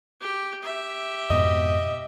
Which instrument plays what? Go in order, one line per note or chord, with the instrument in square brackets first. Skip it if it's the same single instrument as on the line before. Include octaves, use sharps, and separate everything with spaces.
[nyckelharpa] G4
G4 E5
[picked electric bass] F2 G#2 B2 [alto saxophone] D#5